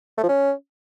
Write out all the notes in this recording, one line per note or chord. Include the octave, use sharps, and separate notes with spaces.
A3
F3
C#4